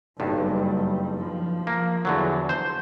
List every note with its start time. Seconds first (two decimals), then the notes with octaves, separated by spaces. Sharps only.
0.20 F#1 B1 G2 G3
1.18 F3
1.67 A#3
2.05 E2 D3 F#3
2.49 C5